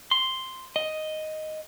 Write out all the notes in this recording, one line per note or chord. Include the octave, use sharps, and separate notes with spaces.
C6
D#5